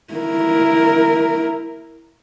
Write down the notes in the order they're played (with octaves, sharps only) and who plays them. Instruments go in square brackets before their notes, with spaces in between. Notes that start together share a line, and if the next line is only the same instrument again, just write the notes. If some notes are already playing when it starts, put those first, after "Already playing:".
[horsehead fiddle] E4 A#4